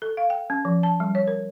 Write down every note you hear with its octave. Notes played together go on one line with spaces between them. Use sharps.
A4
F5
G5
C#4
F3
A5
G3
C#5
A#4